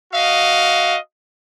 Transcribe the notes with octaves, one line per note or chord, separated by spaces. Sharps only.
F#4 D#5 F5